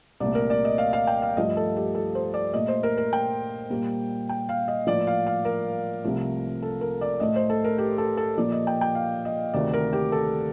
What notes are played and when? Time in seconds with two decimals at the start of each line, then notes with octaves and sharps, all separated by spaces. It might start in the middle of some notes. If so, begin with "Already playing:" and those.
0.20 C2 A#2 A3 D5
0.35 A#4
0.50 D5
0.65 D#5
0.78 F5
0.93 F5
1.07 G5
1.22 F5
1.37 G2 F3 A3 D#5
1.57 A4
1.76 G4
1.95 A4
2.15 C5
2.34 D5
2.54 A#2 A3 D#5
2.68 C5
2.83 A#4
2.98 A#4
3.13 G5
3.70 A#2 G3 A#3
4.29 G5
4.49 F5
4.68 D#5
4.87 A2 F3 A#3 D5
5.07 F5
5.27 F5
5.45 A#4
6.04 C2 C3 F3 A3
6.63 A4
6.81 A#4
7.01 D5
7.20 A2 A3 D#5
7.36 C5
7.50 A4
7.64 A#4
7.78 G4
7.98 A4
8.17 A4
8.37 A#2 F3 A#3 D5
8.52 D#5
8.67 G5
8.81 G5
8.95 F5
9.25 D#5
9.54 D2 C3 D#3 A3 D5
9.74 A#4
9.93 G4
10.12 A4